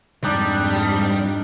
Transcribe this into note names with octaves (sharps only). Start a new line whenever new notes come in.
F2 G#2 G3 D4 D#4